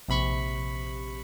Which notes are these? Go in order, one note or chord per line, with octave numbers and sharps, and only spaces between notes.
A#1 C3 B5 C#6